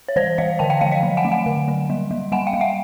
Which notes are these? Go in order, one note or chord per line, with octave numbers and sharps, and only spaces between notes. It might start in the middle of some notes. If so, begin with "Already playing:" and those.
C#5
E3 C5 D5
E3 D#5 F5
D3 G5 A5
F5 G5
F3 F5 G5
D#5 F5
F#3
F#5 G#5
A3
F#5 G#5
D3
F#3
G3
G3
G3 F#5 G#5
F5 G5
G3
E5 F#5